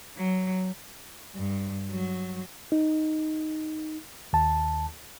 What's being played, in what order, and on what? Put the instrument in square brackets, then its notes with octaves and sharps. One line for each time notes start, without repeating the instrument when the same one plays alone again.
[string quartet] F#3
[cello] G2
F#3
[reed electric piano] D#4
D#2 A5